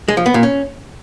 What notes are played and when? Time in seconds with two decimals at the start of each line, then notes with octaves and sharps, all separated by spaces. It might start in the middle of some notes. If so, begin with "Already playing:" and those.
0.08 G#3
0.17 F3
0.26 B3
0.34 A#2
0.43 C#4